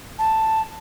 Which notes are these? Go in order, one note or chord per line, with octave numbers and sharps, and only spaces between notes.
A5